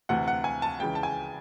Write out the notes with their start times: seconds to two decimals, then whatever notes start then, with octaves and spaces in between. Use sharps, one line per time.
0.09 D2 C3 E3 F#5
0.28 F#5
0.44 G#5
0.62 A5
0.79 C#2 C#3 E3 G5
0.95 A5
1.03 G#5